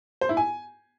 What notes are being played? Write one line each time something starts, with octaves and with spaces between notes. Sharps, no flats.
C5
E4
G#5